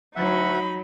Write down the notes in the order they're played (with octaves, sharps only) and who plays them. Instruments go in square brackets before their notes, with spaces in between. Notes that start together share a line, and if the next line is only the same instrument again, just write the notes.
[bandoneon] D2 E5 F#5 [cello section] F#3 [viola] D#4 B5